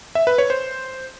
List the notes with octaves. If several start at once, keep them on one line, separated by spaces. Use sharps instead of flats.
E5
B4
C#5
C5